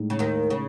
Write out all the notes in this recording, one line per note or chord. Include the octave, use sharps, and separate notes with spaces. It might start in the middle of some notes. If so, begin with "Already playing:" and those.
Already playing: A2 G#3 D#4
C#3
D#2 D#3
C#3